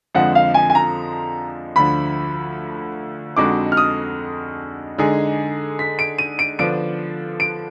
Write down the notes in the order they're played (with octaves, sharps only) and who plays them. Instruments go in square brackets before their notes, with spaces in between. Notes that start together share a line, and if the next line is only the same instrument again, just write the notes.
[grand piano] F2 D3 F3 G#3 [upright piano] F#5
[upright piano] F5
G#5
G#5
A#5
[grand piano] D2 D3 F3 [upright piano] B5
[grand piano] F2 D3 G#3 D#4 F#4 [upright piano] D6
[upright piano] F6
D#6
[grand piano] D3 G#3 D#4 G#4
[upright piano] B6
D7
D#7
D7
[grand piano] D3 F3 B3 D4 [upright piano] D7
[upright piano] D7